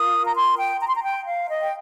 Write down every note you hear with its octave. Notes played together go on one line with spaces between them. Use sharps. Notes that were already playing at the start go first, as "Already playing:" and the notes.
Already playing: F4 A#4 D#6
A#5
C6
G5
A#5
C6
A#5
G5
F5
D#5
G5